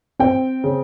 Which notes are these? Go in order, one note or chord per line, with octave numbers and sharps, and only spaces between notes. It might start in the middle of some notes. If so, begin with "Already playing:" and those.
C4 G5
C#3